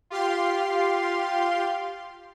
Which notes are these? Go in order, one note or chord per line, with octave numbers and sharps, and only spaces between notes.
F4 G4 F5 C6